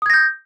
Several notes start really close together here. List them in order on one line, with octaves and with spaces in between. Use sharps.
D#6 G#6 A#6 G6